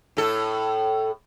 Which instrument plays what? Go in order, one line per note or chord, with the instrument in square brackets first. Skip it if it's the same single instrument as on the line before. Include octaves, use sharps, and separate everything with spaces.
[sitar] A2 A4